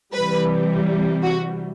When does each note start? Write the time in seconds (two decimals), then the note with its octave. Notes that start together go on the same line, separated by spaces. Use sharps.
0.14 C3 E3 G3 B4
1.23 F#4